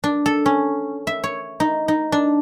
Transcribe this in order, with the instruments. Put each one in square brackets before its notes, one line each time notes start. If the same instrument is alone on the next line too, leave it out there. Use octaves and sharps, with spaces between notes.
[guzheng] D4
A4
C#4
E5
C#5
D#4
D#4
D4